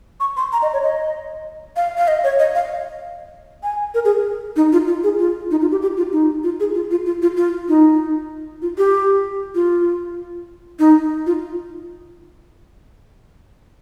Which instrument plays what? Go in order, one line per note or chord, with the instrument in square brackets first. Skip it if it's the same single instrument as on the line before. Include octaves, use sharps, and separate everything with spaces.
[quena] C#6
C6
A#5
D#5
C#5
D#5
F5
F5
D#5
C#5
D#5
F5
G#5
A#4
G#4
D#4
F4
F4
G#4
F4
D#4
F4
G4
G4
F4
D#4
F4
G#4
F4
F4
F4
F4
F4
D#4
F4
G4
F4
D#4
F4